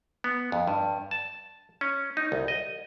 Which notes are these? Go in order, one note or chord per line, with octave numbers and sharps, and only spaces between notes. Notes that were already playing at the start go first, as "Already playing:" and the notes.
B3
F2
G2
A5
C#4
D#4
C2
D#5